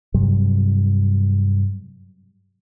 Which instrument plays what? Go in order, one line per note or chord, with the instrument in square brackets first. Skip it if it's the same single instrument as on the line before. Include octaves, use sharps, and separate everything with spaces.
[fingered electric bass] G2 C3 F#3 G3